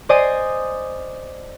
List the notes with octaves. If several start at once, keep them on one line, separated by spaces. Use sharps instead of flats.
C5 D5 D#5 G#5 D#6 C7